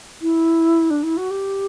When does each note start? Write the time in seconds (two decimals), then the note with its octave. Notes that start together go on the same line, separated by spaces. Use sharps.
0.22 E4
0.90 D4
1.03 E4
1.17 F#4
1.30 G4